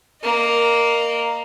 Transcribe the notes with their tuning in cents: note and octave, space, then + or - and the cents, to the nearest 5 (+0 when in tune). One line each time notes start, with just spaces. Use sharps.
A#3 +0 D#5 -30